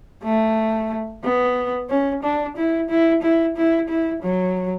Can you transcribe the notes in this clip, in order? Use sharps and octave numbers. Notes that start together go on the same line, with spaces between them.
A3
B3
C#4
D4
E4
E4
E4
E4
E4
F#3